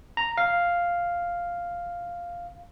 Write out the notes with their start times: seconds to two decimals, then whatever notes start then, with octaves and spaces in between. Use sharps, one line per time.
0.17 A#5
0.38 F5